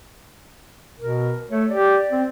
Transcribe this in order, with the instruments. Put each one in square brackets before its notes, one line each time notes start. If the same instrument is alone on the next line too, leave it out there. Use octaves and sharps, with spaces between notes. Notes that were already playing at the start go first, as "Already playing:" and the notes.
[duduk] B2 [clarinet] A#4
[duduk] A3 [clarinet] C#5
[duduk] G4 [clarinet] D5
[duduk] C4